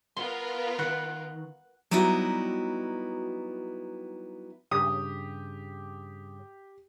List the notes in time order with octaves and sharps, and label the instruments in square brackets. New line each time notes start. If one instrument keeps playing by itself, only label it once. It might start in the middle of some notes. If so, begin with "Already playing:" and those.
[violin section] B3 F4 A#4 [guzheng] C6
[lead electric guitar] D#3 [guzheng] F#5
[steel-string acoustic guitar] F#3 G3 B3 D#4 E4 F#4
[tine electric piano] G2 [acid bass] C#3 [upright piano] G4 [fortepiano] D#6